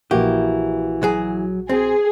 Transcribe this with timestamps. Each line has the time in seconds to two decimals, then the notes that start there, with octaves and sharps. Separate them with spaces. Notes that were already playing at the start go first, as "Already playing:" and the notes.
0.11 A#1 E3 A#3 F#4 G4
1.03 F#3 G#4
1.69 C4 G#4